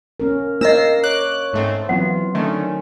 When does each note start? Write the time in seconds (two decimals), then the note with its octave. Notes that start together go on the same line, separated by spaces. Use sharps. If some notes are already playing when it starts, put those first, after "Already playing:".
0.20 A#3 C#4 A#4
0.61 A#3 D4 A#4 D#5 E6 A#6 C7
1.04 C#5 D6 F#6
1.53 G#2 A3 C4
1.89 E3 F#3 B3 C4 F4 F#5
2.35 D3 D#3 A3 C#4